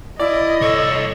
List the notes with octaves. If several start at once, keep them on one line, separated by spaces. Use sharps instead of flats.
E4 D5 D#5
C2 A4 C#5